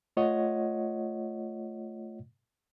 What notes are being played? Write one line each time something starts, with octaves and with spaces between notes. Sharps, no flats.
A3 F4 C#5 D#5 F#5